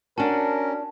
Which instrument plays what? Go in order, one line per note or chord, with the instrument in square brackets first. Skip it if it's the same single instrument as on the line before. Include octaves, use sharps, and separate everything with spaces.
[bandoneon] C#4 [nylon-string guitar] D4 F#4 [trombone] A#4 [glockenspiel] A5